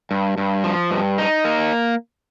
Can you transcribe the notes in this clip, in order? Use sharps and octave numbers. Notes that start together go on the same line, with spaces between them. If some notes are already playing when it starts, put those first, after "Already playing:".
G2
G2
F3
G2
D#4
A#3